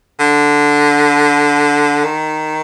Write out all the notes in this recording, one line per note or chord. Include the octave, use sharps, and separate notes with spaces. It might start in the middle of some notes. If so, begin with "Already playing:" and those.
D3
D#3